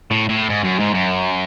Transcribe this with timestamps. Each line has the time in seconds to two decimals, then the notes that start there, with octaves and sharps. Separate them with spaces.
0.11 A2
0.29 A2
0.50 G#2
0.63 F#2
0.79 G#2
0.93 F#2